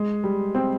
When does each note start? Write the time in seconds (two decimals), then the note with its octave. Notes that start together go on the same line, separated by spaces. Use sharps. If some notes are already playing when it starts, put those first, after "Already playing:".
Already playing: G#3
0.24 G3
0.55 C4